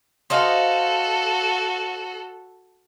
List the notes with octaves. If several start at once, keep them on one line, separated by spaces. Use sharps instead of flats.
F#4 A4 C5 D#5 F5